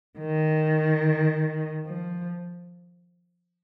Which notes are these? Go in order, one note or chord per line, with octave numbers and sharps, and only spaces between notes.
D#3
F3